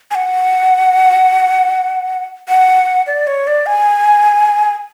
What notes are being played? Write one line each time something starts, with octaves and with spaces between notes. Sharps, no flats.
G#5
F#5
F#5
D5
C#5
D5
G#5